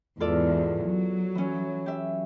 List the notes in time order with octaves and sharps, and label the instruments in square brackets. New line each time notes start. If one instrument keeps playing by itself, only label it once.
[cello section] E2 G#2 [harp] F4 A4 D5
[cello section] F#3
[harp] E3 C#4
G4 E5